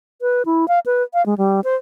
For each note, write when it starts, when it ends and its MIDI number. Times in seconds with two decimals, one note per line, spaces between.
0.22 0.43 71
0.46 0.68 64
0.68 0.79 77
0.86 1.03 71
1.14 1.25 77
1.26 1.34 56
1.38 1.60 55
1.64 1.75 72